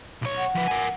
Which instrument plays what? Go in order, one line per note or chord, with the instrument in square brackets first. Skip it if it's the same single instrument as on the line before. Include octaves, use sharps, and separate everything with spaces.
[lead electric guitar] B1 C#5
[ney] F#5
[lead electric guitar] F3 B4
A#4 G#5